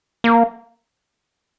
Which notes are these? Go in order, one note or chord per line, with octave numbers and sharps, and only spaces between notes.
A#3